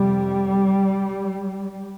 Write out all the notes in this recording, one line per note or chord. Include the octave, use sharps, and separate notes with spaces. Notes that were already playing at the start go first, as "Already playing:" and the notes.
Already playing: F2 C3 G3